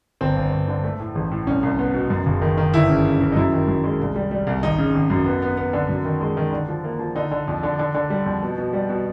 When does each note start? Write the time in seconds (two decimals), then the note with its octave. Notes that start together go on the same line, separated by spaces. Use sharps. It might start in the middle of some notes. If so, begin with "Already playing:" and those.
0.21 G1 C4
0.37 G1
0.52 G1
0.68 D3
0.84 A3
1.00 A2
1.15 A1
1.31 A2
1.47 C2 C#4
1.63 C2
1.79 B3
1.94 B2
2.10 F#2
2.26 F#1
2.42 D#3
2.58 D#3
2.73 G1 E4
2.89 C#3
3.05 C#3
3.21 C#3
3.32 D#4
3.36 F#2 E4
3.53 D#3
3.68 F#2
3.84 G#3
4.00 C2
4.15 G3
4.31 G3
4.47 C2
4.63 G#1 D#4
4.78 C#3
4.95 G#1
5.10 F#2
5.26 B3
5.42 B3
5.57 B3
5.73 D3
5.89 F#2
6.05 D#3
6.21 G#3
6.37 D#3
6.53 D3
6.68 F3
6.84 A#3
6.99 F3
7.15 D3 D#4
7.31 D3
7.47 F2
7.63 D3
7.79 D3
7.94 D3
8.10 G3
8.26 F2
8.42 B2
8.58 B2
8.73 G3
8.89 B2